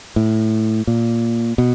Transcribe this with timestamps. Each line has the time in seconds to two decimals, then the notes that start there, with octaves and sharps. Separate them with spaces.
0.16 A2
0.87 A#2
1.58 B2